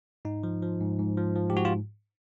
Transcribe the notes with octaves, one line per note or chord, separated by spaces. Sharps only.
G#2 D#4
F3
F3
G#2
G#2
F3
F3
G4
G#2 F#4
F4